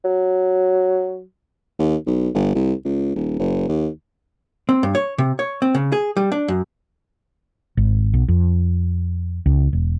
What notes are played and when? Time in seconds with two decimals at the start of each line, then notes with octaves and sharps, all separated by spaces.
0.05 F#3
1.79 D#2
2.06 B1
2.34 G1
2.55 C2
2.84 C#2
3.15 D#1
3.39 F#1
3.68 D#2
4.69 C4
4.83 G2
4.95 C#5
5.18 C3
5.39 C#5
5.62 C4
5.75 C#3
5.92 G#4
6.17 G3
6.32 D4
6.48 F#2
7.77 G#1
8.14 B1
8.28 F2
9.46 C#2
9.73 E1